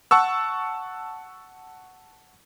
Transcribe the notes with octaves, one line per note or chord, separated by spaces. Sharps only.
F#5 A5 C#6 E6